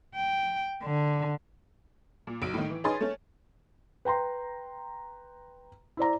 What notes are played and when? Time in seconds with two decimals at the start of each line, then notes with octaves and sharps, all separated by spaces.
0.15 G5
0.83 D3
2.27 A#2
2.42 B1 F#3 D7
2.54 A2 D#3
2.70 E3
2.84 C#4 D#4 G#4 B4 C6 A6
3.01 A3 C#4
4.05 B4 G5 A#5 C6
5.97 E4 C5 D5 A#5